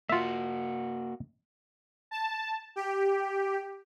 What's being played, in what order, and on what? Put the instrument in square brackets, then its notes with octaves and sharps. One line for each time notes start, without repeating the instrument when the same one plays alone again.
[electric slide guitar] A#3 F#4 [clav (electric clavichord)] F4 E5
[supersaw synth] A5
G4